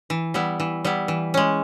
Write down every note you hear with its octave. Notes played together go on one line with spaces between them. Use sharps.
E3
G3 B3 E4
E3
G3 B3 E4
E3
G#3 C#4